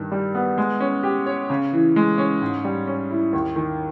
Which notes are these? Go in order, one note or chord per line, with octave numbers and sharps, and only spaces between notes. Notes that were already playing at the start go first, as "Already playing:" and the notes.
Already playing: G2 D#3
G3
B3
G#3
C#4
G4
C#5
C#3
E3
G#3
C#4
G#2
G3
C#4
E4
D#2
D#3